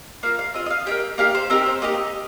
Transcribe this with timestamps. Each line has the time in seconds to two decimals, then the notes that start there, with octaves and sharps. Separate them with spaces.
0.23 A#3 F4 F5
0.39 F5
0.54 C4 F4 D#5
0.66 D#5
0.70 F5
0.86 D#4 G4 G5
0.91 A#3
1.18 A#3 D#4 G4 F5
1.35 C5
1.50 C4 D#4 G4 A#4
1.66 C5
1.82 A#3 D#4 G4 D#5